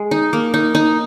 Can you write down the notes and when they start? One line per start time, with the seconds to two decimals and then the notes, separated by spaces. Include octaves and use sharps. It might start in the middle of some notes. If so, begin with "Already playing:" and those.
Already playing: G#3
0.11 D#4
0.33 A#3
0.54 D#4
0.75 D#4